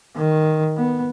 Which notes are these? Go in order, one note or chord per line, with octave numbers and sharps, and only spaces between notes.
D#3
B3